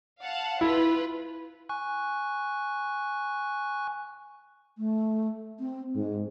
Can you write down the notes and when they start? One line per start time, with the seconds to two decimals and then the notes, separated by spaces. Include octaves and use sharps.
0.23 F5 F#5 A5
0.61 E4 F4 B4
1.69 G#5 C#6 F#6
4.78 A3
5.60 C4
5.96 G#2 G#3